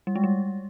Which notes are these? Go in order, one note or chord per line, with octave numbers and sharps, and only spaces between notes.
G3
G#3
G3